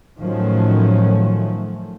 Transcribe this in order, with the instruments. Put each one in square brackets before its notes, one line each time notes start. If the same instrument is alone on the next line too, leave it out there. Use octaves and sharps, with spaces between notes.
[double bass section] A2 D#3 F3 F#3 A3 C#4